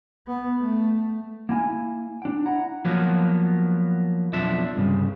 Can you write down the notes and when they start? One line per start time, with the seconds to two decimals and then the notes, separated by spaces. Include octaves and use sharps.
0.27 B3
0.61 A3
1.49 A#3 E4 G#5
2.22 D4 G5
2.46 E4 F#5 A#5
2.85 F3 F#3 A#3 B3
4.33 B1 F2 F3 D4 E5
4.75 C2 G2 A#2 C#3